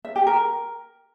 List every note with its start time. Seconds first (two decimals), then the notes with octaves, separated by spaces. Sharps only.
0.05 E5
0.16 G4
0.27 A#4